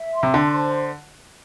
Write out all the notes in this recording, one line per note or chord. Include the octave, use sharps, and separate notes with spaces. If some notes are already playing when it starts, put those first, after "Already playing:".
Already playing: E5
C6
C3
D3 A5
C5